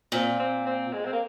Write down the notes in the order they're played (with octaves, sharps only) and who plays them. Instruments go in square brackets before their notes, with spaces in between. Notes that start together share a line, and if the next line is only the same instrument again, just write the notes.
[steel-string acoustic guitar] A#2 [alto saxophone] C4
[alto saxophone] C4
C4
G#3
C4
A#3